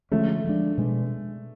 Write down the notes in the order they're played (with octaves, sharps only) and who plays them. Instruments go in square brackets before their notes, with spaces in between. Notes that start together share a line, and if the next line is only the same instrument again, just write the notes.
[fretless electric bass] D3 F3 G#3 C#4 [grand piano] A3
[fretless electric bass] F3 G#3 D4
B2 G#3 D4